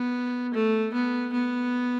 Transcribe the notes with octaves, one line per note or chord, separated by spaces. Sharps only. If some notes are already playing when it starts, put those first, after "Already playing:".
Already playing: B3
A3
B3
B3